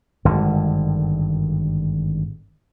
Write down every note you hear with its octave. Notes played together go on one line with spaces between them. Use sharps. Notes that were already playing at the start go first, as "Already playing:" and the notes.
G#1 G2 D3